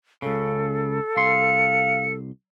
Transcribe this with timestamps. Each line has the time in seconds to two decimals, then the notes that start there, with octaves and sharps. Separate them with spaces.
0.22 C#2 C#3 A4
1.17 C2 F5 C6 C#7